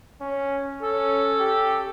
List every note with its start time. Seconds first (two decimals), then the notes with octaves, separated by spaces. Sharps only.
0.21 C#4
0.82 C#4 A4
1.40 G4